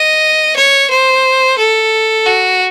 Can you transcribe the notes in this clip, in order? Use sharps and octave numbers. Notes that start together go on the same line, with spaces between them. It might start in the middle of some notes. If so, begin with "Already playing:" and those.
Already playing: D#5
C#5
C5
A4
F#4